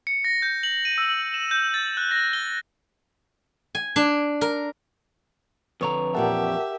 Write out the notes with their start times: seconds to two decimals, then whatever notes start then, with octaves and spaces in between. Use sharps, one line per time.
0.07 C#7
0.24 A#6
0.42 G6
0.63 F#7
0.85 D#7
0.98 E6
1.34 E7
1.51 G6
1.74 A6
1.97 F#6
2.11 A#6
2.33 G7
3.75 G#5
3.96 D4
4.41 A#4
5.81 F2 D3 B4 C#5 A#5
6.15 E2 A#2 G4 A#4 D5 E5 F#5 A5